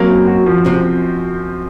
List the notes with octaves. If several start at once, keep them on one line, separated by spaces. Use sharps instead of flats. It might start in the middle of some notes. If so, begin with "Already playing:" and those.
Already playing: F#3 A#3 C4
F#2
F#4
F3
C3 C4